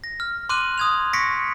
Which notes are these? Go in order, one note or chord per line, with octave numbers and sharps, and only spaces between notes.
A#6
F6
C6 D6 F6 F#6 D#7 F#7
D#6 G#6 F7
C#6 A#6 B6 C#7 D7